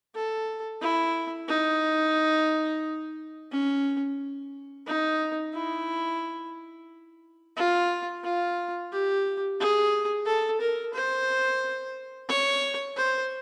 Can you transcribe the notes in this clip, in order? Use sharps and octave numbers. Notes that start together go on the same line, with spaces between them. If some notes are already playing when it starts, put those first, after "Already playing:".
A4
E4
D#4
C#4
D#4
E4
F4
F4
G4
G#4
A4
A#4
C5
C#5
C5